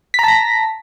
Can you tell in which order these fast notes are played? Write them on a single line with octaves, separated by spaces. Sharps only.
B6 A#5 A5 A#6